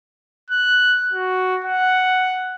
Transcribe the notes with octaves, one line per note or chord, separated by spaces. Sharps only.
F#6
F#4
F#5